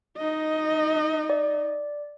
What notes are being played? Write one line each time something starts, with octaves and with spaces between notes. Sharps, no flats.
D#4 D#5
D5